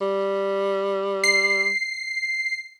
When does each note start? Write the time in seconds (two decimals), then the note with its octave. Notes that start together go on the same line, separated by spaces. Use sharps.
0.01 G3
1.24 C7